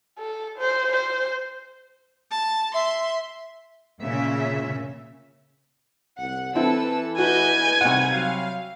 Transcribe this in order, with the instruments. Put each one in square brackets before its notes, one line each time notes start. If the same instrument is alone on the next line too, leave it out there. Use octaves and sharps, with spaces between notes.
[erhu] A4
C5
C5
[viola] A5
[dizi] E5 [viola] C6
[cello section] A#2 C#3 A#3 C#4 E5
[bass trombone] C2 [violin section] F#5
[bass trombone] E3 [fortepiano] C4 E4 [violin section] A4 B4 E6
[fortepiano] F#4 [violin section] B4 D#5 G6 [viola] G#5
[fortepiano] C2 F#5 [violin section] D#4
[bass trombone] F#3 [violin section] F5